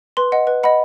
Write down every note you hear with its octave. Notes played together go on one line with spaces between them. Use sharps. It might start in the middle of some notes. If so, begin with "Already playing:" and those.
B4 C6
D#5 F#5
B4
D#5 F#5 B5